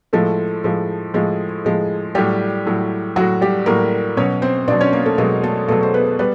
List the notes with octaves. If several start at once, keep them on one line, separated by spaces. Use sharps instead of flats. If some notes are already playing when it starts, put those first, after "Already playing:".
A2 F3 G#3 A3 A4
A2 F3 G#3
A2 F3 G#3 G#4
A2 F3 G#3
A2 F#3 G3 G4
A2 F#3
F#3 F#4
A2
G3 G4
A2 F#3 A#3 A#4
B2 F#3 C#4 C#5
C4 C5
B2 F#3 D4 D5
C#4 C#5
A#3 A#4
A3 A4
B2 F#3 G#3 G#4
A3 A4
B2 F#3 A3 A4
C5
B3 B4
G3 B3 B4